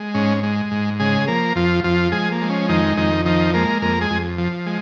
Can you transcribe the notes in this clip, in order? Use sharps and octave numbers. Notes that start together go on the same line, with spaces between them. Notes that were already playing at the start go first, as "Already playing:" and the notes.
Already playing: G#3
G#2 C#4
G#3
G#2
C#3 G#3 G#4
F3 A#3 A#4
F2 F3 F4
F2 F3 F4
F3 G#3 G#4
A#3
G#3
C#4
F2 D#3 D#4
F2 D#3 D#4
D#3 F3 D#4
G#3 A#3 A#4
F2 A#3 A#4
G#3 G#4
F2
F3
G#3